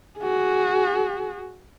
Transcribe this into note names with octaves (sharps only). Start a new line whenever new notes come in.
F#4 G#4